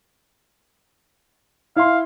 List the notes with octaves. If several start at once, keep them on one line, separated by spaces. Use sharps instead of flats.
E4 F5 C6